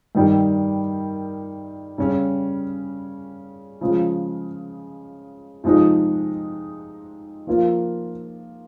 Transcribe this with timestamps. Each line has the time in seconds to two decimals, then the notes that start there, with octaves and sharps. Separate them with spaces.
0.15 G2 D#3 G3
1.98 C#3 G3 C#4
3.81 C#3 F3 G#3
5.64 C3 F3 G#3 D#4
7.47 F3 A#3 F4